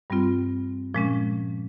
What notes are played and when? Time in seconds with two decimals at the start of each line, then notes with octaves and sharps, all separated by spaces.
0.10 G2 G3 C4 F4
0.94 A#2 F3 G#3 C#4